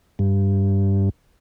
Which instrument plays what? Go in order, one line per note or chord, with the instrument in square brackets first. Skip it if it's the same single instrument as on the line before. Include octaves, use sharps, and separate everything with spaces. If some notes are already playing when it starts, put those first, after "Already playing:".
[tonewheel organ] G2